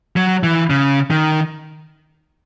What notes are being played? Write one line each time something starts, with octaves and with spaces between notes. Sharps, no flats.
F#3
E3
C#3
D#3